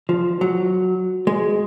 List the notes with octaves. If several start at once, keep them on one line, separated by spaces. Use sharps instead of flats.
F3
F#3
G#3